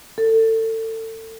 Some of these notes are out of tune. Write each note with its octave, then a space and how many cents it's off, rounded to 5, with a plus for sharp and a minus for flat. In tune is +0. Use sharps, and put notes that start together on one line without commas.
A4 +30